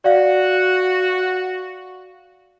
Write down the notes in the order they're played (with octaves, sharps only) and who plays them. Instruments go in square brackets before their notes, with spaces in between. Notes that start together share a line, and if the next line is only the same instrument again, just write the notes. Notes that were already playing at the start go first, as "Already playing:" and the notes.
[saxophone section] F#4 [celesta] D5 F5